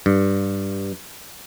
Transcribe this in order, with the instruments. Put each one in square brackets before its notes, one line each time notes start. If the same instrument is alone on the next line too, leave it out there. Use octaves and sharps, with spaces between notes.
[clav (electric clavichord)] G2